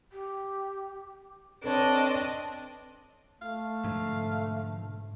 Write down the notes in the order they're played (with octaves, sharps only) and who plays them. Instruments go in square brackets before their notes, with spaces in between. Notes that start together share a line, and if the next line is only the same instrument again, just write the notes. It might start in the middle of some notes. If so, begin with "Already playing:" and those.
[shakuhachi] G4
[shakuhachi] C4 [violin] D4 D#5 [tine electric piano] A4 B4 C#5
[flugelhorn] A3 [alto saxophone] F5
[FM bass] G#2 [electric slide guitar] B2 D3 F3